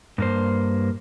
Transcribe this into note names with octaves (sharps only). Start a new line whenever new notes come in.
G2 A#3 C5